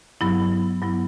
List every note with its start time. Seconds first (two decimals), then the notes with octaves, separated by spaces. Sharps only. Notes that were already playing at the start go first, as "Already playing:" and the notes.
0.21 G2 F#3 B3 E4
0.82 G2 F#3 B3 E4